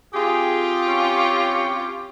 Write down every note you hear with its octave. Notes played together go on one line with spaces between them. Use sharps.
C4 F4 G4 G#4
C#4